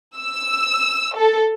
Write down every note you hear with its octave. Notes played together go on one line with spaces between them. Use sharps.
E6
A4